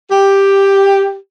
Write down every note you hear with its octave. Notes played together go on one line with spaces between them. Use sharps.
G4